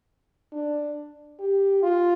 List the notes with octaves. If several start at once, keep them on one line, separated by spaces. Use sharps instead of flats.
D4
G4
F4